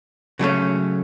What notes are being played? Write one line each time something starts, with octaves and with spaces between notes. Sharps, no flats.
C#3 F#3 A3 C#4